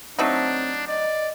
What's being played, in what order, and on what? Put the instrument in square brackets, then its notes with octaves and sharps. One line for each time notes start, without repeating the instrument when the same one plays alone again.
[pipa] F#3 A3 D#4 [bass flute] C4 [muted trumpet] D4
[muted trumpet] D5 [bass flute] D#5